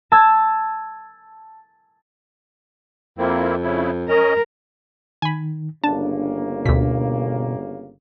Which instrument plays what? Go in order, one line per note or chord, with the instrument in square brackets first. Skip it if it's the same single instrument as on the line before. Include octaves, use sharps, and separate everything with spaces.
[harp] A5 E6 G#6
[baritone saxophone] F2 [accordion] A#3 C4 E4
[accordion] C#3 E4
[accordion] C#4 D#5 [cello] A#4
[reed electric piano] D#3 [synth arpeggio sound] G#5 B5
[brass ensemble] G1 C#3 A#3 [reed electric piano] D4 [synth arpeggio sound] A5
[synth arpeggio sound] D2 B6 [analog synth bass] B2